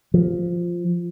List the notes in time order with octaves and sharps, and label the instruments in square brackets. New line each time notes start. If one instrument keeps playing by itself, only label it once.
[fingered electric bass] F3